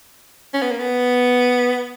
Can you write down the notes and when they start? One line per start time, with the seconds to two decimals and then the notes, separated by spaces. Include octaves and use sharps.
0.54 C#4
0.62 B3
0.71 A#3
0.80 B3